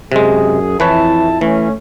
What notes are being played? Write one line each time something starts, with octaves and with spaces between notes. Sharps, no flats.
F#2 C3 G#3 G#4
F2 E3 E4 B4 C#5 A5
E3 A3 C#4